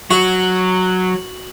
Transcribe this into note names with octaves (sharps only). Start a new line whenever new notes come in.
F#3 F#4